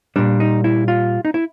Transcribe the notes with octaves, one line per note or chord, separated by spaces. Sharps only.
A#2 G3 D4
D#4
E4
F4
D#4
E4